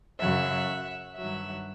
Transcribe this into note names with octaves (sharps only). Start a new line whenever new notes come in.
F#2 C#3 F#3 E5 F#5
G2 D#3 F#3 E5 F#5